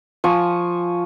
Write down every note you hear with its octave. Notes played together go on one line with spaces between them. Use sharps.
F3 G#5 C#6